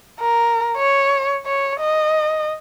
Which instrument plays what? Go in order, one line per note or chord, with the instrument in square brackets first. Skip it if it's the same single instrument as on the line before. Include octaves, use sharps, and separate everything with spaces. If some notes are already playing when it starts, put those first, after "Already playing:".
[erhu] A#4
C#5
C#5
D#5